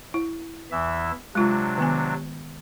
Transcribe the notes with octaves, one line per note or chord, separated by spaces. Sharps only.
E4
E2 E3 E5
C3 F#3 G#3 D4 F4
D#3 B3 G#5